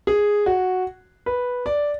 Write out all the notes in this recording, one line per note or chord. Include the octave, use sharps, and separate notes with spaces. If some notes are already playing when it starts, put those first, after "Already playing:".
G#4
F#4
B4
D5